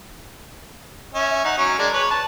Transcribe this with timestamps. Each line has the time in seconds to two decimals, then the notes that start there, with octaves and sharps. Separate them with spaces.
1.14 C#4 E5
1.44 D#4 F#5
1.58 F#3 C#4
1.78 G#3 D4 A#4
1.93 B4 C#5
2.11 A5